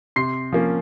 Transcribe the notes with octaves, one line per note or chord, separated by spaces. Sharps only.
C3 C6 C7
F3 A#3 C#4